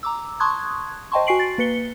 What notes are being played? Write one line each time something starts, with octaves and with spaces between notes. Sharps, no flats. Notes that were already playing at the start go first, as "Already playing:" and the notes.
A#5 D6 E6
A5 C6 C#6 D#6 F#6 G#6
C5 D#5 G5 A5 C6 C#6
F#4 G#5 C#6 C7 D7 F#7
A6
A#3 B4 C#7 G7